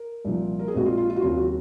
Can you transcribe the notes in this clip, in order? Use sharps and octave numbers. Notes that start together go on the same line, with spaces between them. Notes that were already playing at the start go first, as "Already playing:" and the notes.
Already playing: A#4
C2 A#2 F3
A#4
G#4
A#1 A#2 G#3 C4 F#4
F4
F4
F4
F#4
D#2 C#3 F#3 C4 F4
F#4